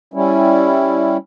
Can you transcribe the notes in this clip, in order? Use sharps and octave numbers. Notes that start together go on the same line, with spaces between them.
G3 C#4 E4